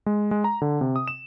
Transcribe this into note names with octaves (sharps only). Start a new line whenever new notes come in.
G#3
G#3
A#5
D3
C3
D#6
E7